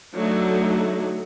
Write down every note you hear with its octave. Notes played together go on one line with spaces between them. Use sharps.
D3 F#3 A3 D#4